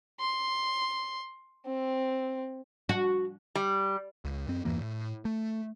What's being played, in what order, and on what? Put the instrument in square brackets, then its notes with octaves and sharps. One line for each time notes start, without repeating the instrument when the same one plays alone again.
[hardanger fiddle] C6
C4
[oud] F#4
[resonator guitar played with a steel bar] G3
[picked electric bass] C#2
F#2 C4
E2 G2 E3 A#3
A2
A3